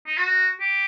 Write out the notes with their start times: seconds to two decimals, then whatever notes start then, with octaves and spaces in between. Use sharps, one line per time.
0.07 D#4
0.17 F#4
0.60 G4